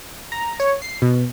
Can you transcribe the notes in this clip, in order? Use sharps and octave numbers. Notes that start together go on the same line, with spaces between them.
A#5
C#5
C7
B2